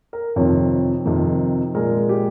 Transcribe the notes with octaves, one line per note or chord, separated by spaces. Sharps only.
A#4
F2 C3 D#3 C#5
F2 C3 D#3
A#2 G#3 A#4
G4